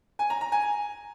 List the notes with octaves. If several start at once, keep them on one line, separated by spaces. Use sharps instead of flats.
G#5
A#5
A#5
G#5